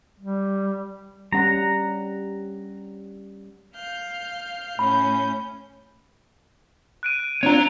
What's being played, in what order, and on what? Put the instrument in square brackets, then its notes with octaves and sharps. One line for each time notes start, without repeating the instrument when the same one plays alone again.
[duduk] G3
[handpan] G3 C#4 F#5 [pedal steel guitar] A#5
[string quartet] F5 F6 G6
[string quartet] A2 C#4 G6 [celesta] B5
[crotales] F#6 D7 D#7
[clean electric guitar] C4 D4 F4 [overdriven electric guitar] C#5 A#5